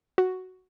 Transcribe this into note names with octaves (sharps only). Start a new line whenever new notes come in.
F#4